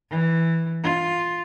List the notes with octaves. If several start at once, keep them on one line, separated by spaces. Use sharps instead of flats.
E3
F4